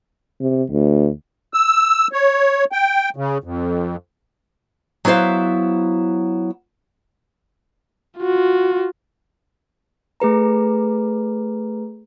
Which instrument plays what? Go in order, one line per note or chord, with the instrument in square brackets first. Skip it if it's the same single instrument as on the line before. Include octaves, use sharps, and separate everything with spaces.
[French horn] C3
D2
[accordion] E6
C#5
G5
C#3
F2
[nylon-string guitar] F#3 B3 E4 C5 F5
[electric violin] F4 F#4
[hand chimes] A3 G#4 B4 A#5